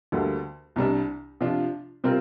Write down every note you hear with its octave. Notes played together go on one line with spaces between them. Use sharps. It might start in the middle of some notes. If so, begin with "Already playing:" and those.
D2 D3 G3 A#3
C2 C3 G3 D4
C3 F3 D4 F4
C3 G3 C4 F4 A#4